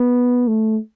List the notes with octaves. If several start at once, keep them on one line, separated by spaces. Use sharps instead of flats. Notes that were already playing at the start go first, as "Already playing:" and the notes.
Already playing: B3
A3